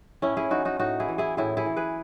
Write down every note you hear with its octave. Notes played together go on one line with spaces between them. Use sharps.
A2 C#4 E4
E4 G#4
E3 D#4 F#4
D#4 F#4
A2 D#4 F#4
E4 G#4
E3
E4 G#4
A2 E4 G#4
E4 G#4
E3
G#4 B4